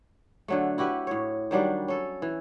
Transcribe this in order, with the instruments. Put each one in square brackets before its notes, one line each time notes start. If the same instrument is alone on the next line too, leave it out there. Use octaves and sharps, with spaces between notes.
[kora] D3 F#3 A3
E4 F#4 G4 B4
A2 C#5
D#3 F#3 G3 D4
C#4 A4
E3